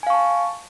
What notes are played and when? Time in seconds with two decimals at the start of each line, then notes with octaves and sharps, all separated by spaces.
0.03 G#5
0.07 F5
0.10 C#6
0.14 A5